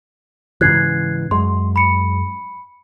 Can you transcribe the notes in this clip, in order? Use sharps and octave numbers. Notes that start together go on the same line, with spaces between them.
G#2 C#3 E3 F#6 G#6 C7
F#2 G#3 C6
B5 C#7